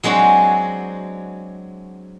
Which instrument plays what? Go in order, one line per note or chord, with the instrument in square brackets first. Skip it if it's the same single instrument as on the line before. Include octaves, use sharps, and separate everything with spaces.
[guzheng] F#3 G#3 C4 D4 F#4